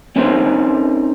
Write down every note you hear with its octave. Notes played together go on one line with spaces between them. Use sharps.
C4 C#4 D#4 A#4 C5